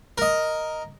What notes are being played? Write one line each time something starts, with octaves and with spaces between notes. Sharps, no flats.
A#4 D#5